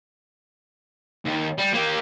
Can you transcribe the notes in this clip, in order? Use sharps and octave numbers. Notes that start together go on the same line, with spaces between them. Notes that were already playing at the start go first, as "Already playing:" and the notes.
D#2
G3
A#3 G4